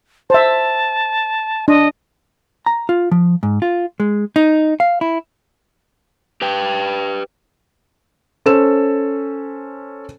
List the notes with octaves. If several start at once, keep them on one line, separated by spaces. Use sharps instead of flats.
C5 E5 A5
D4 D#5
A#5
F4
F3
G#2
F4
G#3
D#4
F5
E4
G4 B4 G5
C#4 A4 C5 E7